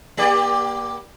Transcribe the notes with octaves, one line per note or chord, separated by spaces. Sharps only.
A#3 G4 D5